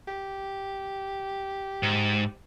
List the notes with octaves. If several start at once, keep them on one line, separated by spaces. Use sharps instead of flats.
G4
G#2